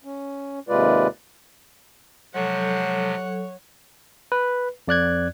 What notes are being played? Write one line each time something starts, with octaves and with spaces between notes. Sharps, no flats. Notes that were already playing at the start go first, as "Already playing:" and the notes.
C#4
D#2 C3 G#3 F4 B4 D5
C3 F3 F#3 G#3 A4 C#5 F#5
B4
F2 D5 F#6 G#6